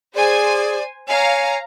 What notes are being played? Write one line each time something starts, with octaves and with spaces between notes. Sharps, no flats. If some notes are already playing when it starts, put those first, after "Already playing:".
G#4 C5 D5 G#5
C#5 F5 G#5 A#5